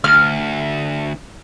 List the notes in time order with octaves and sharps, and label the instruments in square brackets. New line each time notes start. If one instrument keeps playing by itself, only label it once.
[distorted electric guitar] D2 [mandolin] F6